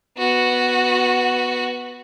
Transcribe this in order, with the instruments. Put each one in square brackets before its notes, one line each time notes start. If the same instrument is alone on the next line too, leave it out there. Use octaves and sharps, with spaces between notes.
[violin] B3 F#4